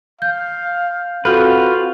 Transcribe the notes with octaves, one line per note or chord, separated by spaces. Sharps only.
F5 G6
C4 F4 F#4 A4 B4 F6 G6